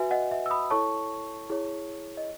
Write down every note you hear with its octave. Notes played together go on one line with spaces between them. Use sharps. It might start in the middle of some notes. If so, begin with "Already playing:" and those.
Already playing: F#4 B4 E5 G#5
D#5 F#5
E5
E6
B5 D#6
E4 A4 C#5 A5 C#6
E4 G#4 C#5
D#5